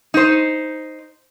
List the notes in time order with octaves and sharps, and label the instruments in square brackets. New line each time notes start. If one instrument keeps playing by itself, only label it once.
[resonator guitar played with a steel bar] D#4 C5